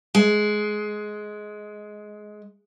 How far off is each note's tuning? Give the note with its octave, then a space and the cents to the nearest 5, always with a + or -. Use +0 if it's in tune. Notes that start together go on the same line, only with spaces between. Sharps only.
G#3 +15